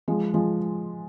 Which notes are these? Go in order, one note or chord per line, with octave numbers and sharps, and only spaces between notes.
F3 G#3
F3 G#3